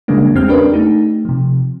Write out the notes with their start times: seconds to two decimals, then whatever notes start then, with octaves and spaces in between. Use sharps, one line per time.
0.08 C#3 E3 G3 G#3 A#3 D4
0.35 E2 G#3 C4 G4 F6
0.48 C#4 D4 G4 A#4 B4 D5
0.72 A3 D#4 G4
1.25 C3 F3